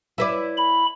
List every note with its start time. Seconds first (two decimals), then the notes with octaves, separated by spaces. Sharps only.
0.18 E4 B4 D5
0.57 B5